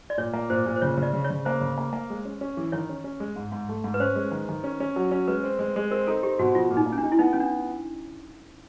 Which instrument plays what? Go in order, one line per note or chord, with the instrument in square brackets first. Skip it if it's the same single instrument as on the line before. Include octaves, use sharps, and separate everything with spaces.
[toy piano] D5
[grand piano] A#2 [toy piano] C#5
[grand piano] A#3
[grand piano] A#2 [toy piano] C5
[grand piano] A#2
[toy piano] C5
[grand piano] C#3 [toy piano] C#5
[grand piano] C#3
[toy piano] D5
[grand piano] C#3
[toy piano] C#5
[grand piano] C#3
[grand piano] A#3 [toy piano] C5
[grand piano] C#3
A#3
A#3
G#3
C#4
C#4
E3
[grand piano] D#3 [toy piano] C#5
[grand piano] C#4
C#4
G#3
G#2
G#2
A3
G#2
[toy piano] B4
[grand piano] C#4 [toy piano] C5
[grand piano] G#3
D#3
D#3
C#4
C#4
F#3
C#4
[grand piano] G#3 [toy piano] B4
[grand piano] C4
G#3
G#3
[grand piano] C4 [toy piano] A#4
[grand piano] D#4 [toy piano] A4
[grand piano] C4 [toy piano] G4
[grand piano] B2 [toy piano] F#4
[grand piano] F3 [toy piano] F4
[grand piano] A#2
[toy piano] D#4
[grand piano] A#3
[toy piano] C#4
D4
[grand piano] D#4
[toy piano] E4
[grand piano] B3 [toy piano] D#4
[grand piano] B3 [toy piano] C#4
[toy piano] D4